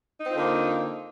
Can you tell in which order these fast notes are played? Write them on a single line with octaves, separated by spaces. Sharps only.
D#4 C4 F4 D3 A#3